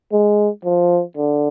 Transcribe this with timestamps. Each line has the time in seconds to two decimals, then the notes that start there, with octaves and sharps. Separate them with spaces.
0.12 G#3
0.64 F3
1.17 D3